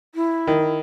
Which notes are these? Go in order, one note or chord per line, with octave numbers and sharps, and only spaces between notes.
E4
D#3